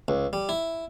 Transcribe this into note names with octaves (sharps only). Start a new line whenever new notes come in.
C#2
G3
E4